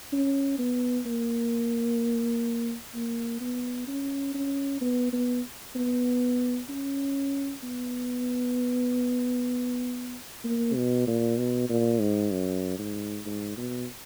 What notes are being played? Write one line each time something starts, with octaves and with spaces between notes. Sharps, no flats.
C#4
B3
A#3
A#3
B3
C#4
C#4
B3
B3
B3
C#4
B3
A#3
B2
A#2
B2
A#2
G#2
F#2
G#2
G#2
B2